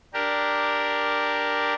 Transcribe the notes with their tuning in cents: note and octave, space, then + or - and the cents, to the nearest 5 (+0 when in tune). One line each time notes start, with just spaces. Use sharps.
D4 +0 G4 +0 A#4 +0